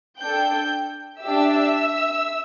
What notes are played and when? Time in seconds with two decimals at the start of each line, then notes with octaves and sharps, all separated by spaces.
0.21 D4 A4 G5 G6
1.21 G4 E5 E6
1.27 D4